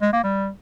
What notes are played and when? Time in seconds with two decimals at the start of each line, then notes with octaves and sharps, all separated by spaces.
0.02 G#3
0.13 A#3
0.23 G3